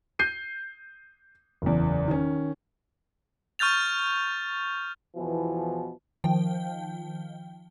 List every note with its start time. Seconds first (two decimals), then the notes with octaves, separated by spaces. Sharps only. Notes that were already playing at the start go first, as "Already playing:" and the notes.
0.19 G6 C7 D#7
1.62 F#1 E2
2.08 D#3 C#4
3.59 C#6 F6 G6 A6 F7
5.16 E2 B2 E3 F3
6.24 D#3 F3 G5